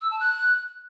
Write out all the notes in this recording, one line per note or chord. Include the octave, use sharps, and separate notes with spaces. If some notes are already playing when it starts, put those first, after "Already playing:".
E6
A5
F#6